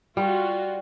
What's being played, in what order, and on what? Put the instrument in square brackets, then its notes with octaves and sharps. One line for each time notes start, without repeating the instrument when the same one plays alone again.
[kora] G3 [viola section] F4 F#4